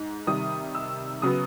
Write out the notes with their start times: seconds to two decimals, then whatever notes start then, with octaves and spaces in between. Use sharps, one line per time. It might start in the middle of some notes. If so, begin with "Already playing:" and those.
Already playing: G#2
0.27 C3 D#3 G3 D#6
0.75 E6
1.22 C#3 F#3 B3 D#6